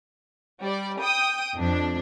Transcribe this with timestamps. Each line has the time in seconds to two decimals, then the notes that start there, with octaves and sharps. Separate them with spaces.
0.62 G3 D5
1.01 G5 D#6
1.55 F2 D4